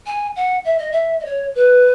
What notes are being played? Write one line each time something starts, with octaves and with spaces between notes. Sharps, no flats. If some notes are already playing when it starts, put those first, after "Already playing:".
G#5
F#5
E5
D#5
E5
D#5
C#5
B4